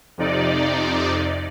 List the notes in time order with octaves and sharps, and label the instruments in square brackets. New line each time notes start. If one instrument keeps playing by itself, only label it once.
[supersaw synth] F2 C3 D#4 D5